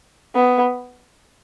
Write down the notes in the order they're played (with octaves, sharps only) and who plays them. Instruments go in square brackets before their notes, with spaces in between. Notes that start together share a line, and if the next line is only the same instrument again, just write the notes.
[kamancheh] B3